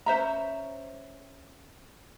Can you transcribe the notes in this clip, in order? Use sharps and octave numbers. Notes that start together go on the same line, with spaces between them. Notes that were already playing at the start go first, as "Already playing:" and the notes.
C#4 C5 E5 A#5